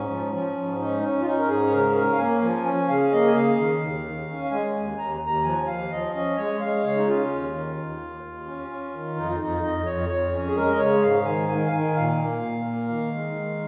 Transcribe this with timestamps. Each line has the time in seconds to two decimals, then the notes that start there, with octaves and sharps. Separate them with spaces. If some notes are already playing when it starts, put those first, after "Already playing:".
Already playing: G#2 C#4
0.09 F3
0.33 F3 C#4
0.56 G#2
0.79 C#4 D#4
1.02 C#4
1.21 F4
1.25 C#4 D#4
1.39 A#4
1.49 G#2 G#4
1.66 C#5
1.72 C#3 A#4
1.95 C#4 A#4
2.13 F5
2.19 A#3 G#5
2.42 F3 G#5
2.65 C#4 G#5
2.89 C#3 F5
3.12 A#3 D#5
3.26 G#5
3.35 C#3 F5
3.58 D#3
3.81 D#2
4.05 D#3
4.28 C#4
4.44 F5
4.51 G#3 G#5
4.75 D#2
4.98 D#2 A#5
5.21 D#2 A#5
5.44 F3 G#5
5.67 D#2 F5
5.91 F3 D#5
6.14 C#4 D#5
6.37 G#3 C#5
6.61 G#3 F5
6.83 C#3 C#5
6.96 D#4
7.07 C#4 F4
7.30 D#2
7.53 D#3
7.77 D#2
8.00 D#2
8.23 D#2
8.46 C#4
8.69 C#4
8.93 D#3
9.16 F2 D#4
9.40 F2 D#4
9.63 F2 D#5
9.86 F2 C#5
10.09 F2 C#5
10.33 C#4
10.48 G#4
10.56 G#3 A#4
10.71 D#5
10.79 C#3 C#5
11.02 G#2 F5
11.25 D#3 G#5
11.49 D#3 G#5
11.66 F5
11.72 D#3 G#5
11.95 A#2 F5
12.19 A#3
12.42 A#2
12.65 A#3
12.88 D#3
13.12 G#3
13.35 D#3